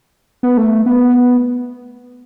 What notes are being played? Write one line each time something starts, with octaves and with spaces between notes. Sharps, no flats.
B3
A3
B3